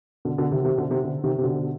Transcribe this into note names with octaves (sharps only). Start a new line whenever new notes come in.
B2 D3
B2 D3
C3 D#3
C3 D#3
B2 D3
C3 D#3
B2 D3
C3 D#3
C3
B2 D3